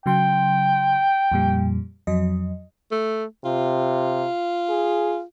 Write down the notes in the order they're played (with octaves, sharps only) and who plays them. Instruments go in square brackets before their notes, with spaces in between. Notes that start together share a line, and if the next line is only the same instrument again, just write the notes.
[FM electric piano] C#3 F#3 C6 [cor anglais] G5
[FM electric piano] F2 A#2 G3
F2 F#3 D#5
[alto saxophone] A3
[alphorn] C3 [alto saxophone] F4
[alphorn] G#4